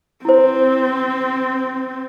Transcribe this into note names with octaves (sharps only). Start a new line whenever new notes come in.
C4 E4 C5